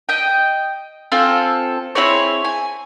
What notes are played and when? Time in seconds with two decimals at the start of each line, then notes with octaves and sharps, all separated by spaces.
0.09 D#5 G5
1.12 C4 F4 A4 G#5
1.95 C4 E4 G#4 C#5
2.45 G#5